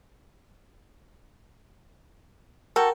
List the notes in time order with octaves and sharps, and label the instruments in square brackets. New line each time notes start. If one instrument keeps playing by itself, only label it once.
[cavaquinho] F#4 A4 [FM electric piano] A#4 G5